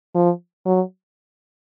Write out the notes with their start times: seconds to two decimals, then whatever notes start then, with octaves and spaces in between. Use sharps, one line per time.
0.15 F3
0.66 F#3